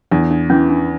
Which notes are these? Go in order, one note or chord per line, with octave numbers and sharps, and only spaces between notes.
E2 D4
D4
E3 C#4
D4